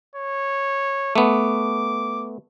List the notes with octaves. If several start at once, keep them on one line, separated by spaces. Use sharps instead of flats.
C#5
A3 B3 D6